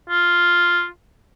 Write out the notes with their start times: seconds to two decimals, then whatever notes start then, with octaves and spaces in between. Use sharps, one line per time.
0.09 F4